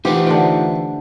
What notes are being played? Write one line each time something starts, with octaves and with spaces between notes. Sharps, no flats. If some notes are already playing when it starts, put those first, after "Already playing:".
E3 A3 D#4 F4 G4 C5 F#5
D3 C5 G5